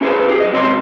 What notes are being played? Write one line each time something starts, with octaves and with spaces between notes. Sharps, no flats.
C#4 E4 G#4 A4 B4 C5
G4 G#4
F#3 D#5
C#2 C3 C4 C#4 C6